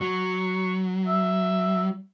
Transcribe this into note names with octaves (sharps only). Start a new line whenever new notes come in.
F#3 C#6
E5